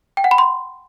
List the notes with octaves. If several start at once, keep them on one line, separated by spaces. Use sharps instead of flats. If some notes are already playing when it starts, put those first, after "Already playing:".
G5
F#5
B5
C6